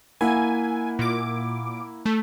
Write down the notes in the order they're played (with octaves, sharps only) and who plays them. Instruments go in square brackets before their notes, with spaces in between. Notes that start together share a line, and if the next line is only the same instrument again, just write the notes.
[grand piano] A#3 E4 F#5 [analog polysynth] G#5
[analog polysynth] A#2 D6
A3